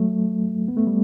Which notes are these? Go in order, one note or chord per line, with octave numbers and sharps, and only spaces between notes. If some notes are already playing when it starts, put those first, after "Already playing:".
Already playing: F#3 A3
B3
A3
G3